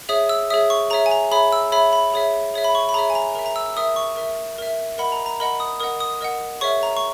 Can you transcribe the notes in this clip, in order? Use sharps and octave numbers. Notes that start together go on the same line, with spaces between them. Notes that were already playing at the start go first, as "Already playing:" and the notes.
G#4 C#5 E5 D#6
E6
G#4 C#5 E5 D#6
C#6
G#4 C#5 E5 A#5
G#5
A#5
G#4 C#5 E5 B5
E6
G#4 C#5 E5 B5
B5
G#4 C#5 E5
G#4 C#5 E5
B5
C#6
B5
G#4 C#5 E5 A#5
G#5
A#5
A#4 E5 A#5
A#5
E6
E6
A#4 E5 D#6
C#6
A#4 E5
A#4 E5
A#4 D#5 F#5 B5
A#5
A#5
A#4 D#5 F#5 B5
D#6
A#4 D#5 F#5 D#6
D#6
A#4 D#5 F#5
G#4 C#5 E5 C#6
A#5
C#6